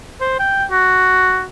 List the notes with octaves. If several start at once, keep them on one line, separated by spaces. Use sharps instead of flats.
C5
G5
F#4